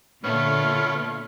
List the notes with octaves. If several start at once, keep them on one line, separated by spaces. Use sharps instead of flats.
A#2 D3 A3 B3 F4 C#5 F6